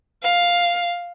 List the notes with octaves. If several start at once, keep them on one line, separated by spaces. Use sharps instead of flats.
F5